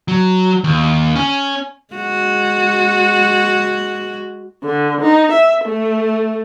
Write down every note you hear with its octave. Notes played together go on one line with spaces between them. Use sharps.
F#3
D#2
C#4
G#3 F#4
D3
D#4
E5
A3